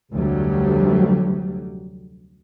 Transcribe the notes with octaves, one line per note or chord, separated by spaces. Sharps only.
F1 D2 F#3 G3